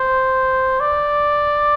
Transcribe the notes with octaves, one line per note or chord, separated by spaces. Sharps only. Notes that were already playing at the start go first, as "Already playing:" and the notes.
Already playing: C5
D5